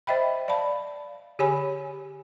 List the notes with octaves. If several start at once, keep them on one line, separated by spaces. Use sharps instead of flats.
C5 D#5 E5 G5 B5
D5 F5 A5 B5
D3 G4 G#4 C#5 G#5 B5